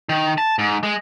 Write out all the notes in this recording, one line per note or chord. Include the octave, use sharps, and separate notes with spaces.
D#3
A5
G#2
G#3